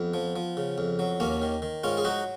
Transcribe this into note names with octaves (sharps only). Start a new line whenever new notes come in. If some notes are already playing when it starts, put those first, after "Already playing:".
Already playing: F2 B3
F3
F3
C#3
F2
F#3
D#2 A#3 C#4
D#3
D#3
G#2 C#4 F4
G#4
F#3 D#4 F#4